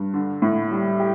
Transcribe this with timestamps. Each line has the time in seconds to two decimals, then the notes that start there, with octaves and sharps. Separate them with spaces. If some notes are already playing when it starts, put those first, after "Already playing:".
Already playing: G2
0.14 D3
0.42 A2
0.71 G3
1.00 G4